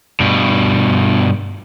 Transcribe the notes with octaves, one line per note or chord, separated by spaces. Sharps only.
G2 B2